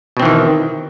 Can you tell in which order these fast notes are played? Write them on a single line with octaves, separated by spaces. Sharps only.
B2 C4 E3 D#3